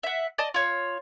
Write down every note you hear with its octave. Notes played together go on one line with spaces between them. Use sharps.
E5 F#5
D5 D#5 A5
F4 C#5